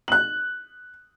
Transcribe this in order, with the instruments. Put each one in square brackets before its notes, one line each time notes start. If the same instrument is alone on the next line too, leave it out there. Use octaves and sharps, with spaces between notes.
[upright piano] F#6 F#7